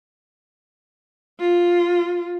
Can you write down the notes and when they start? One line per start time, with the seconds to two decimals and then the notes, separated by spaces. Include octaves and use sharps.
1.40 F4